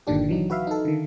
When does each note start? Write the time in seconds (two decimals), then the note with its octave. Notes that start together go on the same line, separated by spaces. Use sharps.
0.07 G1 A#2 D3 D#3 D4 G4
0.29 E3 F#3 D#4
0.50 F#4 B4 E5 F5
0.67 D#4 A4
0.85 D3 D#3